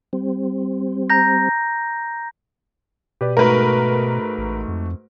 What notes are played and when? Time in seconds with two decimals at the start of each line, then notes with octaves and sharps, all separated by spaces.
0.13 G3 C4
1.10 A#5 G6 A#6
3.21 B2 G4 B4 D5
3.37 G#2 A3 F#4 A#4 B4
4.38 A1
4.68 F2